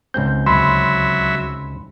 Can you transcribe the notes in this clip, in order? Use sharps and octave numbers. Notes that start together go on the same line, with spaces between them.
C#2 G#2 C4 G6
D2 F#3 E5 B5 C6